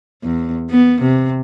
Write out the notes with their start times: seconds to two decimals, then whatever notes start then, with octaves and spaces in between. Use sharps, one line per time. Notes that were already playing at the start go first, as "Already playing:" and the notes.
0.23 E2
0.70 B3
1.01 C3